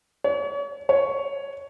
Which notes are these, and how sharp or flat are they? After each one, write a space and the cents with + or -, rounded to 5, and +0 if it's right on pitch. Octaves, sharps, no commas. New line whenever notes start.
C#5 +35
C#5 +5